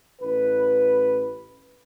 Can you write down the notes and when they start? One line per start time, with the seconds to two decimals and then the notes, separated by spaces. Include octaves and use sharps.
0.21 A1 B4